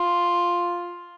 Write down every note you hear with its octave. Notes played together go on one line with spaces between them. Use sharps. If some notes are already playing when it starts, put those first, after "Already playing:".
Already playing: F4